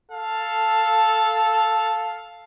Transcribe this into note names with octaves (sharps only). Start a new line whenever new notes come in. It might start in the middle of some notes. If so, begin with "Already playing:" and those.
A4 F5